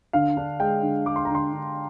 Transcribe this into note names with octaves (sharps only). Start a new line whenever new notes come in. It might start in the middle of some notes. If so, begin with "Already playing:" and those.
D3 F5
D4
G#3 G5
D3
G#3 D6
C6
A#5
D3 C6
D3